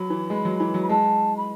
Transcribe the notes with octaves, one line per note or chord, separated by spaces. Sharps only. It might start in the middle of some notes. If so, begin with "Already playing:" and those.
Already playing: F#3 B5
E3
G#3
F#3
E3
F#3
B5
G#3 A5
B5